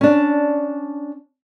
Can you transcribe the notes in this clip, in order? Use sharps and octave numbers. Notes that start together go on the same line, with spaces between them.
C#4 D4